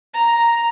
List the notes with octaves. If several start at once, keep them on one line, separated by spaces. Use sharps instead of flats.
A#5